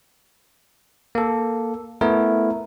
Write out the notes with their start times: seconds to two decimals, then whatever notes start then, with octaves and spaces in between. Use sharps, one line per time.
1.15 A#3 A4
2.01 A3 B3 E4 A#4